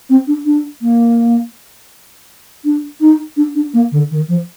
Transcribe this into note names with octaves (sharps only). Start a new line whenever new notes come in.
C4
D4
D4
A#3
D4
D#4
D4
D4
A#3
D3
D#3
F3